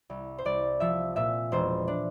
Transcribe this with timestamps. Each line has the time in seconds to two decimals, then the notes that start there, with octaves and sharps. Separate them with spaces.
0.10 C2
0.38 C5
0.45 C2 D5
0.80 F3 E5
1.16 A#2 E5
1.52 E1 C5
1.88 D4